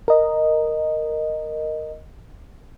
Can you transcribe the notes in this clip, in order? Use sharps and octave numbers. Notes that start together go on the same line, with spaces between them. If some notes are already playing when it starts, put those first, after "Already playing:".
A#4 D#5